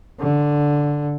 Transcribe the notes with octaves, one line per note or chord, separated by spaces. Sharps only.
D3